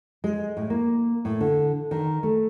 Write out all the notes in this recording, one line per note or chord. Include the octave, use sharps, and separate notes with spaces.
G#3
A2
A#3
A2
D3
D#3
A3